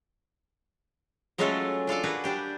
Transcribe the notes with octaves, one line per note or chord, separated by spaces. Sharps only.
F#3 G#3 A3 C#4 F4 A4
D4 F4 A4 D5
A#3 F#4 G#4 B4
G3 D4 G4